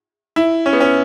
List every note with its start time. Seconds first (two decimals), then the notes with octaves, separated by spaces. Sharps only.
0.36 E4
0.66 C#4
0.73 B3
0.80 C#4